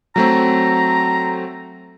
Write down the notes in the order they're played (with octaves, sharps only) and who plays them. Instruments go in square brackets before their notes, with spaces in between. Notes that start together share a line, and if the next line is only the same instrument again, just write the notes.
[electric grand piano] F#3 A3 C4 [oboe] A#5